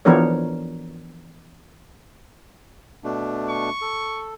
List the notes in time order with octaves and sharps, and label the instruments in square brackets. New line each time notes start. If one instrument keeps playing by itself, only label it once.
[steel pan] E3 F3 B3 D4 A#4 C#5
[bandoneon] B2 A3 D4
[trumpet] C#6
[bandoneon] A4